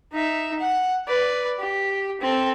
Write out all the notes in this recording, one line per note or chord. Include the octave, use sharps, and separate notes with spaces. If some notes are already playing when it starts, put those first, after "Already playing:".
D#4 E5
F#5
B4 D5
G4
C4 A4